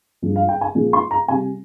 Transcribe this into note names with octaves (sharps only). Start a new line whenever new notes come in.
G2 F3 G#3
F5
G5
G#5
A#2 F3 G#3
C6
A#5
C3 G3 G#5